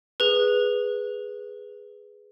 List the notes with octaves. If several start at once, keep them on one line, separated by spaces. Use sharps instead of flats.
G#4 B4